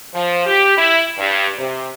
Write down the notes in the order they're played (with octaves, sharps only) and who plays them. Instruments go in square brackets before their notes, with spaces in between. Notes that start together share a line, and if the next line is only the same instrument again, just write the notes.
[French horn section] F3
G4
E4
G2
C3